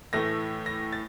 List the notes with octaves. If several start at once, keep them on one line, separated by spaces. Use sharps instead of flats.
A2 E3 A3 A#6
A#6
A6